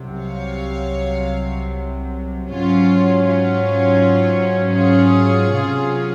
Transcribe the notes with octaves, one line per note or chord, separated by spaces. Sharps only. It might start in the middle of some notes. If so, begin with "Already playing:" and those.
Already playing: C2 C3 F#3
C#5 F5
G#2 F#3 C#4 F4
F4
F4 G#4
C3 F#3 C#4 F4